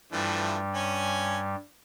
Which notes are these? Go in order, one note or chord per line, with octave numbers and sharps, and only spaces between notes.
G2 E3 F3 G3 A3
C#4 G#5